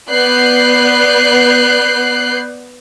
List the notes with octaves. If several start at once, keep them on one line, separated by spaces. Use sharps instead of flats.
B3 D5 F#6 G6 C7